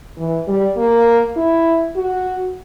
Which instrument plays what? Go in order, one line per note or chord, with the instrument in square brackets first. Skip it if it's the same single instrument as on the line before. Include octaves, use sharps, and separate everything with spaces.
[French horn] E3
G3
A#3
E4
F#4